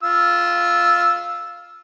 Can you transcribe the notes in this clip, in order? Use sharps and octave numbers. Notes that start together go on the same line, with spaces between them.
F4 E6